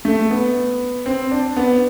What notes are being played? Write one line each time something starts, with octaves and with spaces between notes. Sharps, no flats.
A3
B3
C4
D4
B3